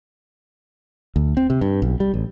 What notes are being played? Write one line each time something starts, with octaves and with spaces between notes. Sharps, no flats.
D2
C4
C3
G2
B1
G3
A1